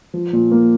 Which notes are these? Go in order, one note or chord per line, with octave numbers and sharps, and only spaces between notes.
F3
A#2
A#3